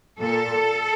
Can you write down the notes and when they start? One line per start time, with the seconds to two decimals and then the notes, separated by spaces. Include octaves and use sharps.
0.19 A#2 A4